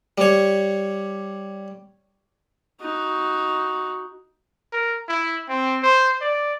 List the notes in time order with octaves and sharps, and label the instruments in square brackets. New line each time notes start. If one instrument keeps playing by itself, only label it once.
[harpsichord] G3 C#5
[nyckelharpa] D#4 F#4
[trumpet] A#4
E4
C4
C5
D5